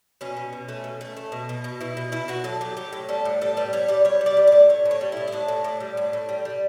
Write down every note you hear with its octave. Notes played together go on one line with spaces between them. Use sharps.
B2 C#4
B2
B2
A3
B2
A3
A3
B2
B2
B2
B2 E4
B2
B2 E4
B2 F#4
F#3 A4
F#3 G4
A2 G4
A2
G3 A4
A2
G3 A4
G3 B4
G3 C#5
G3 D5
G3 C#5
G3
D5
G3
A2 D5
A2 C#5
A2
C#5
G3
A2 E4
E4
A2 D4
A2
A2
G3
A2
A2
G3
G3